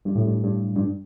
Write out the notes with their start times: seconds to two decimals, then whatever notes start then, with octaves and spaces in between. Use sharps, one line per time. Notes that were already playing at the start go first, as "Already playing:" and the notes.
0.05 G2
0.15 A2
0.26 G2
0.44 G2
0.76 G2